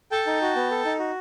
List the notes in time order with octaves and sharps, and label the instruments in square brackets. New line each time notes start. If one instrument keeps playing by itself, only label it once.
[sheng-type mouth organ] A4 G5 A5
D#4
F#4
B3
A4
D#4
F#4